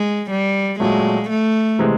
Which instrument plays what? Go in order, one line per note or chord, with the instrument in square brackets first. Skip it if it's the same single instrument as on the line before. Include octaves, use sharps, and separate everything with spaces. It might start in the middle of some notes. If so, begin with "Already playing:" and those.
Already playing: [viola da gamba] G#3
G3
[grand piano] A#2 F#3 A3 [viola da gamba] G#3
[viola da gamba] A3
[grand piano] C3 E3 G#3